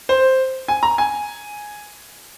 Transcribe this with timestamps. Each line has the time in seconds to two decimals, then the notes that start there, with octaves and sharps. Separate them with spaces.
0.09 C5
0.68 G#5
0.83 A#5
0.98 G#5